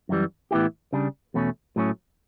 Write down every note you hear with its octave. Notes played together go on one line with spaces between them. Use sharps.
F#2 E3 G3
A2 E3 B3 E4 G4
C#3 G3 D4
E2 B2 A3 C#4
A2 F#3 A3 C#4